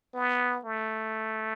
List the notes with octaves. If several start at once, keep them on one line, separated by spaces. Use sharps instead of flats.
B3
A3